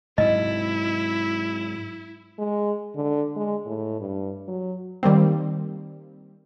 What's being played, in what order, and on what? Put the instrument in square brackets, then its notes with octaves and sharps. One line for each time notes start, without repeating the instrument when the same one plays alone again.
[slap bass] G#2 C3 F#3 [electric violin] E4 [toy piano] D#5
[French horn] G#3
D3
G#3
A2
G2
F#3
[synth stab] D#3 G3 A#3 C4